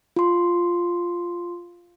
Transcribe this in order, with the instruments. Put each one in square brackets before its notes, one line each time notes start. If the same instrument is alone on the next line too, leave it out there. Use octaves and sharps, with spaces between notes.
[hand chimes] F4 C6